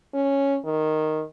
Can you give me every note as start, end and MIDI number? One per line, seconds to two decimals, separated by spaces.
0.14 0.58 61
0.65 1.23 51